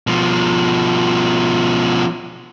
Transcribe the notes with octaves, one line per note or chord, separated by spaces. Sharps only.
B2 F3